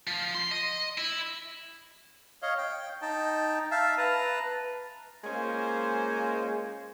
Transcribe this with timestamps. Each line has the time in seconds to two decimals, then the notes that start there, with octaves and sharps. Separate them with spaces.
0.07 F3
0.35 C6
0.52 D#5
0.98 E4
2.42 C#5 D#5 F5
2.58 G5
3.02 D#4 G5 A5
3.71 E5 F5 A5
3.98 B4 A5 A#5
5.24 G#3 A#3 C#4 F4 C5